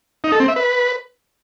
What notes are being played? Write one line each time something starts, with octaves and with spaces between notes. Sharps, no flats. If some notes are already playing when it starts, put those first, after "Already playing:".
D#4
A4
C4
E5
B4